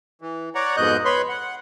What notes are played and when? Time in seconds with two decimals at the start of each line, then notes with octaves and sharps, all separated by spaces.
0.21 E3
0.55 C#5 D5 F#5 A#5
0.77 F2 G#2 B2 D#5 F#6 G6
1.05 B4 C#5 B5 C6
1.29 F#5